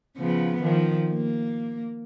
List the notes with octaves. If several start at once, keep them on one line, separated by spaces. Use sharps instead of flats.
C#3 F3 B3
D#3 F3
A#3